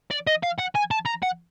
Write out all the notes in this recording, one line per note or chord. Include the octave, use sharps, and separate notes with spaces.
D5
D#5
F5
F#5
G#5
A5
A#5
F#5